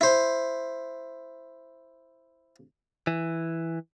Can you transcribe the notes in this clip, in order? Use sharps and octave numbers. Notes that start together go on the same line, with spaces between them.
E4 C5
E3